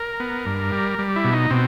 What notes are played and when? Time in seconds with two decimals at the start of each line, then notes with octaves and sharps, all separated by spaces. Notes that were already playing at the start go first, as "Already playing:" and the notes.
Already playing: A#4
0.20 B3
0.46 G2
0.72 G3
0.99 G3
1.16 E4
1.24 B2
1.33 D#4
1.50 B2 C4